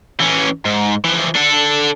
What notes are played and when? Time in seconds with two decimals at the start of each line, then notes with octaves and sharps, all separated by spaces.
0.20 E3 C#4
0.65 G#2
1.05 E3 F3
1.35 D4 A4